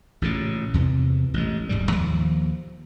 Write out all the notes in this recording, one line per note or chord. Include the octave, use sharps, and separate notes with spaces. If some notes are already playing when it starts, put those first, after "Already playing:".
A1 A#2 C#3
E2 C3 E3
A1 G#3
D1 E2 G#2 G3
D#2 F3